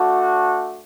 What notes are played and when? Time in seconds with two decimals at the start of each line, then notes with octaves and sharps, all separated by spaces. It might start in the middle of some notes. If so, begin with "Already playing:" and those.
Already playing: A3 D4 F#4